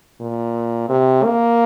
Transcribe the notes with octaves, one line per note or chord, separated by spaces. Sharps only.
A#2
C3
A#3